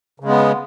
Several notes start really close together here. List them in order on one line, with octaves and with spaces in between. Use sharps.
C#3 G#3 B3